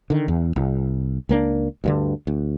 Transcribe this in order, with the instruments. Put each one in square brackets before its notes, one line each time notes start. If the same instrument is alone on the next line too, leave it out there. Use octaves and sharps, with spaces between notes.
[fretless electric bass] D3 D#3
E2
C2
C#2 A#3 C4 D4
D2 G2 D3
D2